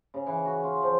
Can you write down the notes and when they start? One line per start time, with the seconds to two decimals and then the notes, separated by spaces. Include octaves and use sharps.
0.14 C#3
0.27 E3
0.45 F#4
0.63 F4
0.82 F3